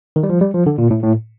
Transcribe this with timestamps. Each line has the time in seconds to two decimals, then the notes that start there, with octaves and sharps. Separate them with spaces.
0.16 D#3
0.23 G3
0.29 F3
0.41 G3
0.54 F3
0.66 D3
0.78 A#2
0.90 A2
1.03 A2